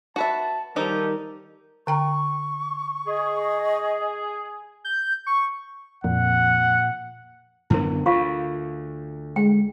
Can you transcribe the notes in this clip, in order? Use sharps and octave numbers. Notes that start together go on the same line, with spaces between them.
F#4 B4 E5 A5
D#3 F3 G3 D#4 G4 A4 A#4 D#5
D3 G5 A#5 C#6
G#4 D#5
G6
C#6
F2 A#2 F#5
F#2 D3 B3 E4 A#4
D2 F4 F5 C#6
G#3 G5